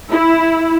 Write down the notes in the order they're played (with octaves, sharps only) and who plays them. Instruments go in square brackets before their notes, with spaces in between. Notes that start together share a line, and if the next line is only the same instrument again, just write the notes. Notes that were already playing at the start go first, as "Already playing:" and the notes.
[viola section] E4